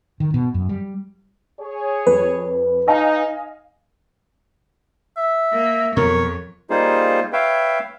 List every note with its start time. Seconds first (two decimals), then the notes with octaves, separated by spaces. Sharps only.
0.20 D#3
0.34 B2
0.54 F#2
0.69 G3
1.60 G#4 C#5
2.07 F2 B4
2.88 D#4 D#5 F5 G#5
5.16 E5
5.53 A#3
5.97 F2 B2 F3 F#3 A#4 C#5
6.70 G3 A#3 D#4 F4 G#4 C5
7.33 B4 C#5 E5 F5 G5